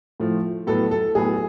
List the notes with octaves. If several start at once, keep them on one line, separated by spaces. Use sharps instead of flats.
A2 F3 A3
A2 F#3 B3 A4
A4
A2 F#3 B3 G#4